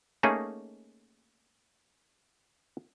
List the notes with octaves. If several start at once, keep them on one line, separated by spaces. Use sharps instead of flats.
A3 A#3 C#4 D#4 G#4 D#5